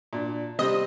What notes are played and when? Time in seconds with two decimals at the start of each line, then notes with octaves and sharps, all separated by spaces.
0.13 A#2 D4
0.59 C3 G3 C4 D#5